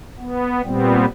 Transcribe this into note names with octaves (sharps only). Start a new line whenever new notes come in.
B3
A#2 G3 B3 C4